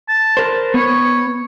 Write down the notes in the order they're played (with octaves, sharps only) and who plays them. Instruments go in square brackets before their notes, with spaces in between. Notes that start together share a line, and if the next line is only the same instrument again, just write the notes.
[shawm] A5
[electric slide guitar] A#4 C5
[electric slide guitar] B3 [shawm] C#5